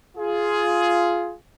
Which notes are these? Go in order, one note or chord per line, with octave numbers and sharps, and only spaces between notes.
F4 G#4